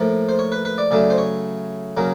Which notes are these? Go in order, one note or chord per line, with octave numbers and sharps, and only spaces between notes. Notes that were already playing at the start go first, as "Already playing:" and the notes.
Already playing: A2 F3 A#3
C5
C#5
B4
B4
D5
C#3 F#3 A3 D5
C5
C#5
C#3 F#3 A#3